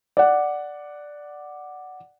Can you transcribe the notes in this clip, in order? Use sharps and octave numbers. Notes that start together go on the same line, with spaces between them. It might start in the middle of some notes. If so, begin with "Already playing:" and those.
D5 F#5